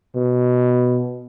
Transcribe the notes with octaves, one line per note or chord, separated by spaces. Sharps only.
B2